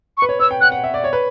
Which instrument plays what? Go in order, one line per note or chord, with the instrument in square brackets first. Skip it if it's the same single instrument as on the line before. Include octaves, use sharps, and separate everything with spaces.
[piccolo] C#6
[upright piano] B4
C#5
[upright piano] C#5 [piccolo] E6
[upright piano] G5
[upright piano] F#5 [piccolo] F#6
[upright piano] F#5
E5
D5
C#5
B4